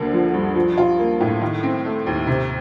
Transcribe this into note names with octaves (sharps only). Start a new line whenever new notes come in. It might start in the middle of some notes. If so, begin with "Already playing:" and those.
Already playing: D2 D3 A#3
F3
G2
F3
F4
A#3
A2
D#3
C4
A3
D#2
C3